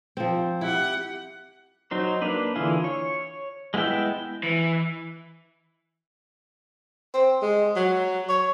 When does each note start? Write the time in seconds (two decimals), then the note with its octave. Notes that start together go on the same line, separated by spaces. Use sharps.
0.17 F3 C4
0.61 E4 G4 F#5
1.91 F#3 D#4 C5
2.22 A#3 D4 B4
2.56 D3 E3 E4 F4 G#4
2.84 C#5
3.74 G#3 B3 E4 E5 G5
4.43 E3
7.14 C4
7.42 G#3
7.76 F#3
8.29 C#5